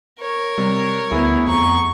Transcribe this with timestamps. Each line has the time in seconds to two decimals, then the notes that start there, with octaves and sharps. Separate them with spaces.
0.20 A#4 C#5
0.58 C3 G3
1.12 D2 A3 B3 E4 G#4
1.48 F2 A#5 C#6